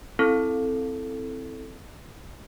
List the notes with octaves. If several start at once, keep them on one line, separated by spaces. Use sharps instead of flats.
C4 E4 A4